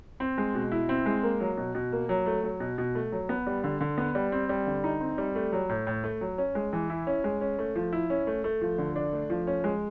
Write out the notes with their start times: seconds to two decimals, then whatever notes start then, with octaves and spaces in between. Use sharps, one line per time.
0.20 C4
0.38 G#3
0.55 B2
0.72 E4
0.89 C4
1.06 G#3
1.23 A#3
1.40 F#3
1.57 B2
1.75 B2
1.92 A#3
2.09 F#3
2.26 A3
2.44 F#3
2.60 B2
2.78 B2
2.95 A3
3.12 F#3
3.29 B3
3.47 G3
3.64 D3
3.81 D3
3.98 B3
4.15 G3
4.32 C4
4.49 G3
4.67 D3
4.84 D#4
5.01 C4
5.18 G3
5.35 A3
5.53 F#3
5.69 A2
5.87 A2
6.04 A3
6.21 F#3
6.38 C#4
6.55 G#3
6.73 E3
6.90 E4
7.07 C#4
7.24 G#3
7.41 C#4
7.59 A3
7.76 F3
7.93 E4
8.10 C#4
8.27 A3
8.44 A3
8.61 F3
8.78 D3
8.96 D4
9.13 A3
9.30 F3
9.47 C#4
9.64 G#3